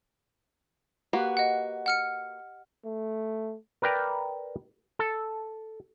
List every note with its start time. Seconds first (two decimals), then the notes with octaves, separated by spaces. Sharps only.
1.13 A#3 F#4 G4 B4
1.37 D#5 F#5
1.86 F#5 F6 C#7
2.84 A3
3.82 A#4 B4 D5 G5 A#5
4.99 A4